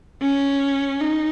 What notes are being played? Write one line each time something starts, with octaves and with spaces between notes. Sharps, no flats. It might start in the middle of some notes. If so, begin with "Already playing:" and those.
C#4
D#4